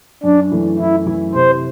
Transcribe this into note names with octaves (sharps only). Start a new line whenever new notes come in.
F#2 D4
E3 A3 E4
F#2 E4
E3 A3 E4
C3 C5